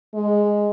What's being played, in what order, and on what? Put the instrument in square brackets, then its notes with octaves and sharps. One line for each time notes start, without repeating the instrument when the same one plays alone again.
[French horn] G#3